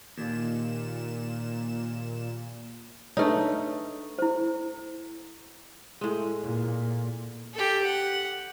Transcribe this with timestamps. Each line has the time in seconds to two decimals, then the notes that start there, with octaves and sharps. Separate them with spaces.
0.18 D#2 A#2 E7
3.17 A3 D4 D#4 B4 C#5
4.19 E4 C5
6.01 A2 G#3
6.42 A#2
7.54 G4 A4
7.84 F#5